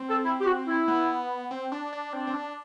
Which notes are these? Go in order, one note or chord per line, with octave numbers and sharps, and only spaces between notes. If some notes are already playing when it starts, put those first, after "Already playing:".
Already playing: C4
A4
E4
G4
F#4
E4
B3
C4
D4
D4
C4 D4
C4
D4